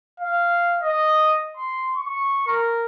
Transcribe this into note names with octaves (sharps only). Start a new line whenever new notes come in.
F5
D#5
C6
C#6
A#4